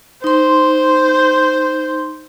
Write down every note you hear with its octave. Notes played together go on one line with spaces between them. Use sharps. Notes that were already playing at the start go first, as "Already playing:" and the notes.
D#4 C5 C6